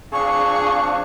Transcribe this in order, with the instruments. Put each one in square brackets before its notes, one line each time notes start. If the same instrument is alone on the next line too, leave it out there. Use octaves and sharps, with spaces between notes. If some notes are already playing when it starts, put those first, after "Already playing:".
[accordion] F3 C4 D4 [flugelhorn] G#4 [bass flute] F5 [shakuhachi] C#6